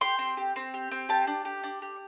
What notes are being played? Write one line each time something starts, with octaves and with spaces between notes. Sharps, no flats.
G4 C6
C4
G4
C4
G4
C4
G4 A5
D4
G4
D4
G4